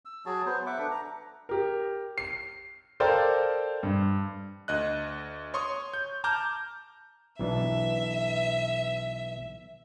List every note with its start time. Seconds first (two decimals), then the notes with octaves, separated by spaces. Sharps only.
0.05 E6
0.26 F#3 F#4 G#4 A5
0.46 B3 C5
0.66 E5 F#5 D6
0.79 D4 A4 B4
0.91 A#5
1.49 G4 A#4
2.18 C7
3.00 A4 A#4 C5 D5 F5 G5
3.83 G2
4.68 D2 D#5 F#6
5.54 C#5 C6 C#6 D#6
5.94 G6
6.24 A5 A#5 D6 F6 G6
7.39 B1 E3 D4 E5